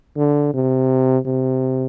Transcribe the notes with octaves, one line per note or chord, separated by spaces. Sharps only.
D3
C3
C3